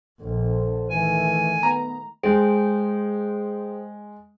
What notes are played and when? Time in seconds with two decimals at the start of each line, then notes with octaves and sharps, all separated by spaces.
0.21 A#1 D3 A4 C5
0.90 D#3 E3 A3 G#5
1.63 B3 A#5
2.23 G#3 G#4 C5 G5